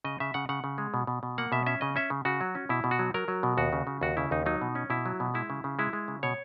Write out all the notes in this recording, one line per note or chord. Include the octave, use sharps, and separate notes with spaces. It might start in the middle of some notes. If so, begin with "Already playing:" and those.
C#3 D#5
C#3 E5
C#3 F#5
C#3 F#5
C#3
G#3
B2
B2
B2
A#3 F#5
B2 E5
C#4 E5
C#3 D#5
C#4 E5
C#3
C#3 F#4
F#3
C#4
B2 E4
B2
F#4
F#3
F#3 A#4
F#3
B2
D#2 F#4
C#3
C#3
D#2 F#4
C#3 E4
D#2 D#4
F#3 D#4
B2
C#4
B2 E4
F#3
B2
G#3 E4
C#3
C#3
G#3 E4
G#3
C#3
B2 C#5